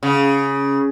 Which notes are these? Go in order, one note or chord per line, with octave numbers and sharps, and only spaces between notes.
C#3